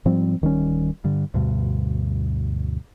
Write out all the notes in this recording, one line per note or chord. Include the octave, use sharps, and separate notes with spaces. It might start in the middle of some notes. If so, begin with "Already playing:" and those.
G#2 F3 G3 C4
D1 D#3 G3 C#4
G2 D3
D2 G2 B2